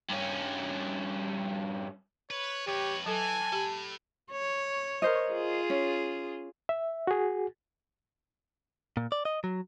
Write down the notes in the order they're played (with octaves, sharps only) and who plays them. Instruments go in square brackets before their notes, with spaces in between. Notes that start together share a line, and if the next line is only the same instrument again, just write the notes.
[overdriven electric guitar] G2 C#4
[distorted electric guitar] B4 [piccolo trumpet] C#5
[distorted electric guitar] F2 B4 [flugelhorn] G4 [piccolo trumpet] C#5
[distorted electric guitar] E3 [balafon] F#3 A4 [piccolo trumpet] G#5 [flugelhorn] A5
[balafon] G4 [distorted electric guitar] A4 B5
[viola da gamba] C#5
[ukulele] A#4 C5 D#5
[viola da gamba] F4 G#4
[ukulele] C#4
[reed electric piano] E5
F#4 G#4
[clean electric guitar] A#2
D5
D#5
F#3